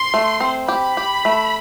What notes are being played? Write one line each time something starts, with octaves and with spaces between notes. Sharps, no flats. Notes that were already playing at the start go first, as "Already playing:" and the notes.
Already playing: C6
A3
C4
G4 B5
G4
A3